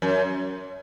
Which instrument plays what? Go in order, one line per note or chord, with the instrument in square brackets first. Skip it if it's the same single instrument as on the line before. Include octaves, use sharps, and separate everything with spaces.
[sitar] F#2